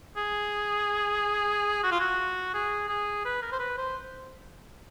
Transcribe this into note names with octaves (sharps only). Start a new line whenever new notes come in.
G#4
F#4
F4
F#4
G#4
G#4
B4
A#4
C5
B4
C5